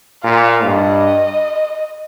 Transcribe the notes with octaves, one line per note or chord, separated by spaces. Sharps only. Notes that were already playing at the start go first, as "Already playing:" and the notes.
A#2 F5
G2 D#5